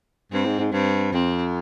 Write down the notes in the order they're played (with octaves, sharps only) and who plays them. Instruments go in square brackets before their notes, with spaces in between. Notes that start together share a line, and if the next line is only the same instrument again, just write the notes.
[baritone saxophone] G2 [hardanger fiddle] C4
[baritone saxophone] G#2
G#2
[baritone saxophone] G2 [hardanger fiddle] C4
[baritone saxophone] F2 [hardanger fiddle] C4